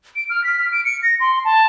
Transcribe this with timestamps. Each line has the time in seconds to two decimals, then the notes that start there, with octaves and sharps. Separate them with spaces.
0.16 D7
0.30 F6
0.44 B6
0.59 F6
0.72 D7
0.85 C#7
1.03 A#6
1.20 C6
1.45 A5